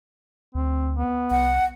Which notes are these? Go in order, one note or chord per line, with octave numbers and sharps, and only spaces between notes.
D2 C4
B3
C2 F#5